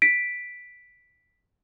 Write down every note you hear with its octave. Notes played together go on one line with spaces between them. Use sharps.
B6 D7